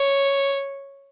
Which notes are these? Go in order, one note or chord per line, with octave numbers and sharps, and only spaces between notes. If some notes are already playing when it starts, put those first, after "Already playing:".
Already playing: C#5